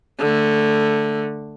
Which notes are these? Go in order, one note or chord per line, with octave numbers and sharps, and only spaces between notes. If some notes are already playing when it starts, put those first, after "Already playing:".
D3 A3